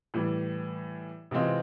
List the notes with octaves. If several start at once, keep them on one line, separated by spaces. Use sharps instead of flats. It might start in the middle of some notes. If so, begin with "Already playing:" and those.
A2 E3 G3
C3 E3 G#3 C4 F4